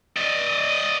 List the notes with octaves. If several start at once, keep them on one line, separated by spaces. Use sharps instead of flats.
D5 D#5